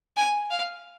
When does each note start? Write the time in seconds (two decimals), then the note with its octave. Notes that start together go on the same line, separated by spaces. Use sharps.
0.17 G#5
0.50 F5